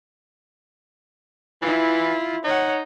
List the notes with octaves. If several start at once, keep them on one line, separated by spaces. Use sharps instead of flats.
E3 E4 F4
D#4 C#5 F#5